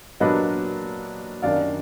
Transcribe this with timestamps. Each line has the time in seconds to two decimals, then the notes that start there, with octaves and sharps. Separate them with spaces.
0.20 A#2 F#3 A#3 D4 B4 D#5
1.42 F#2 D#3 F#3 D4 D5 F5